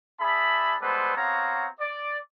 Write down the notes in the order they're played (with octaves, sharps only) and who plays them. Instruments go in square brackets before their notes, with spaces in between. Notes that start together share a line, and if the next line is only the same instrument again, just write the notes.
[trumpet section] D4 G#4 E5 A5 B5
G3 G#3 B3 A4 B4 C5
B3 C4 F#4 C#5 F5 A#5
D5